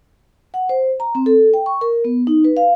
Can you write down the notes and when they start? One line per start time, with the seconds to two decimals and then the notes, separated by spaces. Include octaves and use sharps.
0.54 F#5
0.69 C5
1.00 A#5
1.15 C4
1.26 A4
1.54 G5
1.66 C#6
1.81 A#4
2.05 B3
2.27 D#4
2.44 B4
2.57 F5